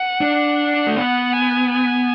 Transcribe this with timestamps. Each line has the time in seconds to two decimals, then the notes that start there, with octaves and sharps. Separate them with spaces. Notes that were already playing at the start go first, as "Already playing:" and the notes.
Already playing: F#5
0.21 D4
0.87 A3
0.96 B3 F#5
1.33 G#5
1.71 G#5